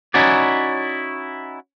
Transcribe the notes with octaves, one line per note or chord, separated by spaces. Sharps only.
C#4 D#4 E4 F#4 C#5 D5